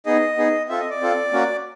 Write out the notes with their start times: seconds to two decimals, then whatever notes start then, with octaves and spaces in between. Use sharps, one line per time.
0.06 B3 D#4 G#4 D#5
0.37 B3 D#4 G#4
0.69 C4 F4 A4 E5
0.80 D#5
0.90 D5
1.01 C4 F4 A4
1.32 A#3 C#4 F#4